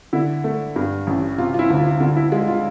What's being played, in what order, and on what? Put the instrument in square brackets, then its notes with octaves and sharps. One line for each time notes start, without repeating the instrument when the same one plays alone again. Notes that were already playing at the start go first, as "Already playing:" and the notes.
[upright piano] D3 E4
A3
G2
A1
C3 F4
F4
E4
D2
F4
D3 F4
E4
G#3 F4
F4